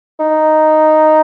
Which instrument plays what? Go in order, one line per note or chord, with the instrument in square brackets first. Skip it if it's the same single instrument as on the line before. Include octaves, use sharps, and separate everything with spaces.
[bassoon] D#4